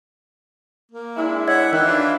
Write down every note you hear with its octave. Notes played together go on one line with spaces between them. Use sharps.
A#3
G#3 D4 E4
C#5 D#5 E5 F#5 G#6
D#3 E3 E4 F#6
D4 F4